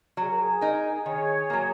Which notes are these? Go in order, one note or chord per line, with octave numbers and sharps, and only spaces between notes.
F#3 G#4
A#4
G#4
D#4 A#4
D#3 G#4 C#5
F#3 A#3